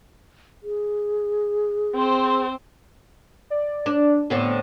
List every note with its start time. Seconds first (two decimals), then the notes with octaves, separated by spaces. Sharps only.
0.63 G#4
1.95 C4 C5
3.50 D5
3.86 D4
4.30 A2 D3 B3 C4